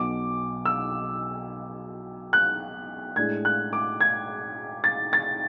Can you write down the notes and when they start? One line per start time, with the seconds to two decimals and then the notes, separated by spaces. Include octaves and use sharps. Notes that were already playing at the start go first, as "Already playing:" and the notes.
Already playing: B1 B2 F#3 D6
0.65 E6
2.33 F#6
3.16 A2 G#3 D4 G#6
3.45 F#6
3.73 D6
4.01 G#6
4.84 A6
5.13 A6